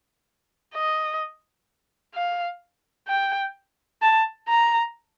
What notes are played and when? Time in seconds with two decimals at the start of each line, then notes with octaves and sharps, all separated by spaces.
0.75 D#5
2.14 F5
3.08 G5
4.02 A5
4.49 A#5